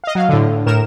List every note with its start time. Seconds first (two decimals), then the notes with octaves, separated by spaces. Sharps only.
0.04 D#5 F5
0.15 F#3 F5
0.29 A2 D3
0.66 A2 A#4 E7